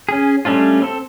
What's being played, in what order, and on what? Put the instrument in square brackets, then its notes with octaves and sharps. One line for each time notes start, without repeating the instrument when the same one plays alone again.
[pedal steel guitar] C#4 G#4
G3 A3 C#4 D4 F4
C4 A4